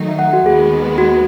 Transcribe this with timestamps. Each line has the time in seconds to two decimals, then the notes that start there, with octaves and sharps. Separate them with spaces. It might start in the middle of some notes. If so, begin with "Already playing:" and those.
Already playing: D#3 F#3 A3 D#4
0.08 E5
0.19 F#5
0.33 F#4
0.45 D#2 D#3 G#3 B3 G#4
0.98 F#4